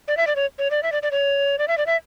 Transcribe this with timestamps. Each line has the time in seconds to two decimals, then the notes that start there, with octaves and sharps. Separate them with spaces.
0.08 D5
0.17 E5
0.27 D5
0.36 C#5
0.59 C#5
0.71 D5
0.83 E5
0.92 D5
1.03 D5
1.11 C#5
1.59 D5
1.68 E5
1.78 D5
1.86 E5